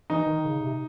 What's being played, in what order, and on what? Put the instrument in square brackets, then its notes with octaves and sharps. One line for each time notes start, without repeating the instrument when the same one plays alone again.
[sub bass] E3 [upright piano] D#4
[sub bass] D#3
C#3
C3